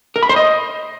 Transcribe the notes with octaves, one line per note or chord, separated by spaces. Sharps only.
A#4
B5
C5
D#5